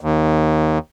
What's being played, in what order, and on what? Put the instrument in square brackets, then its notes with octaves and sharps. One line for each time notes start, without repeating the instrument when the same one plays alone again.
[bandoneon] D#2